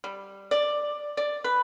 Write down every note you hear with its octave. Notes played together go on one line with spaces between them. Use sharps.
G3
D5
D5
B4